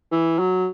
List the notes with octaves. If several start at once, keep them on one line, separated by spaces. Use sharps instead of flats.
E3
F#3